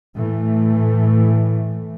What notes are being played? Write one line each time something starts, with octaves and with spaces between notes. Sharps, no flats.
A2 E3 A3